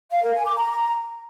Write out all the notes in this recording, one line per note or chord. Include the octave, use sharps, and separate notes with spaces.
F5
A#4
G#5
D6
A#5